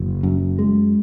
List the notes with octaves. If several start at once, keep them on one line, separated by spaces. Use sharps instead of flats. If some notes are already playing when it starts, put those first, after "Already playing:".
Already playing: F#1
F#2
G#3